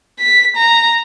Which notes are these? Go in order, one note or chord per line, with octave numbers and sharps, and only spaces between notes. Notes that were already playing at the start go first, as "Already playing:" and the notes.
B6
A#5